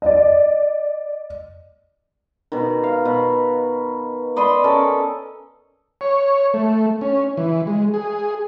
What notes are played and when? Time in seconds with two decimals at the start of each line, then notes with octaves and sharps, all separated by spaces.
0.02 D5 D#5
2.52 B2 D#3
2.84 F5
3.05 B2
4.36 D5 D#5 B5 C6
4.64 C#4 A4 A#4
6.01 C#5
6.54 A3
7.01 C#4
7.37 E3
7.67 G#3
7.94 G#4